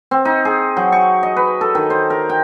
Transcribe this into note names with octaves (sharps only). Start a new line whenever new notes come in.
C4
D#4
G#4
F#3
C#6
D#5
B4
A4
D#3
C5
A#4
G5